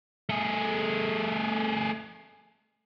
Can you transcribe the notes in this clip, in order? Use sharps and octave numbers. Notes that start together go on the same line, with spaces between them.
A3 G#4